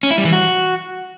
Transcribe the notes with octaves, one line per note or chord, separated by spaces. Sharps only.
C#4
E4
G3
E3
F#4